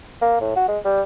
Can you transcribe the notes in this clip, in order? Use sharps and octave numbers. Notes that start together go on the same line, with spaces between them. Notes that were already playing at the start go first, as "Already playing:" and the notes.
A#3
A2
F#4
G#3
G3